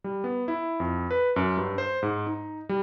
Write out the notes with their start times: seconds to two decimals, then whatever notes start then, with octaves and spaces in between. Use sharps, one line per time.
0.04 G3
0.24 B3
0.48 E4
0.80 F2
1.11 B4
1.36 F#2
1.57 G2
1.78 C5
2.03 G#2
2.27 D#4
2.69 G3